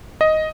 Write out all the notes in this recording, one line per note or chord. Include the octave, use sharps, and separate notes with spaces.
D#5